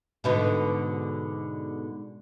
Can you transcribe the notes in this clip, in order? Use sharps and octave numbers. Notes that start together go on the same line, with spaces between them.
G#2 B2 D3